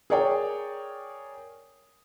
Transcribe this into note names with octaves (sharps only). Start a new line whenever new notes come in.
G#4 A#4 C#5 D5 G5